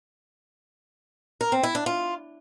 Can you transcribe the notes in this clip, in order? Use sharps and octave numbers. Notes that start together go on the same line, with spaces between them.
A#4
C4
E4
D4
F4